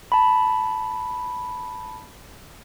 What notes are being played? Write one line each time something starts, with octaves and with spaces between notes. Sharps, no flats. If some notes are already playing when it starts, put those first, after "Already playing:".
A5 B5